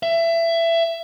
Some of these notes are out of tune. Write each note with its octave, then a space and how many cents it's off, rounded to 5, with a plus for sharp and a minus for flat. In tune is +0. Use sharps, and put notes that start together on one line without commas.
E5 +20